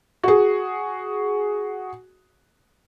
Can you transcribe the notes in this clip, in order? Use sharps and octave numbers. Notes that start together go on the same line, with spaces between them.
F#4 G#4